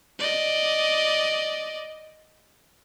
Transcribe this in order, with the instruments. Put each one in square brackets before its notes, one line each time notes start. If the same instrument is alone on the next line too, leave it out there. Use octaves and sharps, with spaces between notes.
[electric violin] D5 D#5